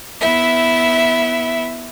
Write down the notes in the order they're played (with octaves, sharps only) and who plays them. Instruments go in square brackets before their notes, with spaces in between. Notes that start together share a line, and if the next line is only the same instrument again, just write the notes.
[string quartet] B3 E4 E5